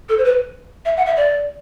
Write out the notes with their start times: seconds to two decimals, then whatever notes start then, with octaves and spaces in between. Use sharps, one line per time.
0.09 A4
0.18 C5
0.24 B4
0.85 E5
0.97 F#5
1.06 E5
1.17 D5